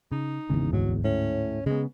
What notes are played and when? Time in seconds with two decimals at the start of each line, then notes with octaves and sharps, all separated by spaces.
0.12 C#3 D#4
0.50 G#1 E2 C#3
0.73 D2 G#2 F#3
1.04 A2 C#4
1.66 C#3 G#3 B3